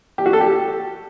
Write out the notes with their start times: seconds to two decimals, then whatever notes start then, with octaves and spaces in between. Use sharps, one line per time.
0.18 G4
0.26 F#4
0.33 A4
0.41 G4